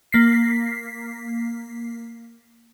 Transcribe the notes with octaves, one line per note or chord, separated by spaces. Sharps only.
A#3 B6 C7